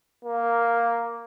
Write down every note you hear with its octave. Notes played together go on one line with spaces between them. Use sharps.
A#3